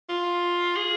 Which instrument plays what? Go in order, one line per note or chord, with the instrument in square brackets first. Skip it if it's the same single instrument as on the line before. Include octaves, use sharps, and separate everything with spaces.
[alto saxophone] F4
G#4